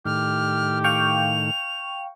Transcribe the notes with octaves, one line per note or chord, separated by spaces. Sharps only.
A2 D#3 G4 F6
F5 G5 C#6 F7